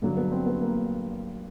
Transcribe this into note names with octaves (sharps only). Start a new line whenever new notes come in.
G2 D3 F#3
B3
C4
B3
A#3